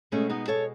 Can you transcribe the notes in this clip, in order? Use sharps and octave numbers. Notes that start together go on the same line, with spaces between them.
B2 G#3 A3 C#4
B3 D#4
A4 C#5